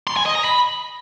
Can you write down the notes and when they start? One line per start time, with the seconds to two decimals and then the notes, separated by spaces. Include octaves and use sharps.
0.07 C6
0.16 G#5
0.26 D#5
0.35 A#5
0.44 B5